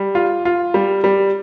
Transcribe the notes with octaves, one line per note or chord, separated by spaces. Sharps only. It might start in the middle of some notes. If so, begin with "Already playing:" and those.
Already playing: G3
F4
F4
G3
G3